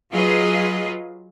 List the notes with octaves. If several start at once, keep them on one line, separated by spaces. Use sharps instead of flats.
F#3 F4 G#4 B4 D#5